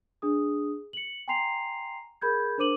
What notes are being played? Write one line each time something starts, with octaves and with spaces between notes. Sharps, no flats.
D4 G#4 D#6
C#7 F#7
G5 G#5 A#5 C6 C7 F7
G#4 A#4 B5 G6 G#6
D4 A#4 C5 D6 D#7 F#7